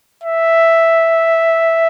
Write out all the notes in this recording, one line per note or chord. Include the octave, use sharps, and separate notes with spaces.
E5